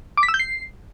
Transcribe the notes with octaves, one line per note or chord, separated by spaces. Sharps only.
D6
B6
E6
G6
C7